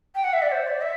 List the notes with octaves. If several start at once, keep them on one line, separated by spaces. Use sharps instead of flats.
G5
F#5
E5
D5
C5
D5
E5